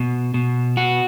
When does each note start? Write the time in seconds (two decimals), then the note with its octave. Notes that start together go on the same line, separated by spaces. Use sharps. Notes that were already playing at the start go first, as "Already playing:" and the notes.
Already playing: B2
0.34 B2
0.77 F#4